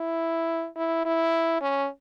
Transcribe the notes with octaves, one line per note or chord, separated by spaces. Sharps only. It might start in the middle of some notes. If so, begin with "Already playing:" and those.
Already playing: E4
E4
E4
C#4